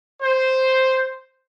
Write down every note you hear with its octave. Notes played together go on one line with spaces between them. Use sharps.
C5